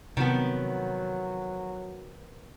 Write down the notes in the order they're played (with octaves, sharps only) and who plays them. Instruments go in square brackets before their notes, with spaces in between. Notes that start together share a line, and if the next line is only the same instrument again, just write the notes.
[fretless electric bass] C3 [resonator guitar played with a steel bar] D#3 F3 B3 [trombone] F#3